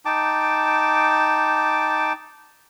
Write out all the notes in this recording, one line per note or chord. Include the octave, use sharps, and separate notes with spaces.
D#4 G5 A5 D6